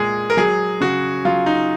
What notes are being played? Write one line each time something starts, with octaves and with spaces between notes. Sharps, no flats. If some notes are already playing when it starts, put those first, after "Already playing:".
Already playing: A#2 G#3 G#4
A#4
F#3 G#4
C#3 F#4
F#3 F4
D#4